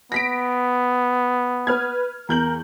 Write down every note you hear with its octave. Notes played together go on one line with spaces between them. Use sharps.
B3 A#6 B6 D7
B4 F6 G#6
E2 A#4 G6 F#7